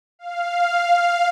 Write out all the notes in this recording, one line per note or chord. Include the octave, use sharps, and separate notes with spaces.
F5